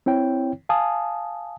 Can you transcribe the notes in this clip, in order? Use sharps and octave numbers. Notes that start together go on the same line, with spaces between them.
C4 E4 C#5 G5
F5 G#5 A5 D#6